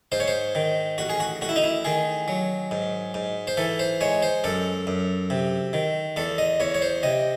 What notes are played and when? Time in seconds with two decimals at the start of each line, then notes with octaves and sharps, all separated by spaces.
0.12 G#2 C5
0.20 C#5
0.28 C5
0.55 D#3
0.98 A1 F#4
1.09 G#4
1.20 F#4
1.41 A1 F#4
1.49 E4
1.56 D#4
1.63 E4
1.85 D#3 G#4
2.28 F#3
2.71 G#2
3.14 G#2
3.47 C5
3.57 E3 A4
3.79 C5
4.01 G#3 C#5
4.22 C5
4.44 F#2 A4
4.87 F#2
5.30 C3
5.73 D#3
6.17 E2 A4
6.38 D#5
6.60 E2 C#5
6.74 C#5
6.82 C5
7.03 C3 D#5